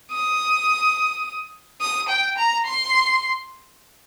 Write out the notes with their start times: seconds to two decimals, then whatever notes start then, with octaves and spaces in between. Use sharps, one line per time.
0.12 D#6
1.81 D#6
2.09 G5
2.38 A#5
2.66 C6